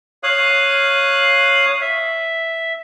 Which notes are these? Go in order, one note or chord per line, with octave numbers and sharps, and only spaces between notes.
C#5 F5 D#6 F#6
E5